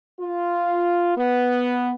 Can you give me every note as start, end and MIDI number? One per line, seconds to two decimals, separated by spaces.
0.20 1.16 65
1.17 1.92 59